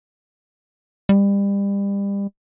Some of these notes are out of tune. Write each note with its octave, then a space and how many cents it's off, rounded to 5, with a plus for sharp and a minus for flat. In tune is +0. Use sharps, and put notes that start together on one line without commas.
G3 +30